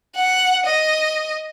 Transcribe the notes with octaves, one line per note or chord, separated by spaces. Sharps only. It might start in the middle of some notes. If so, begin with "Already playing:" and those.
F#5
D#5